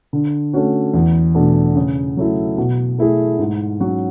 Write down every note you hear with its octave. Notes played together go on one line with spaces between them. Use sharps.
D3
A3 C#4 F#4
E2
B2 A3 D4
C#3
F#3 A3 E4
B2
A3 E4 G#4
G#2
F#3 C#4 F#4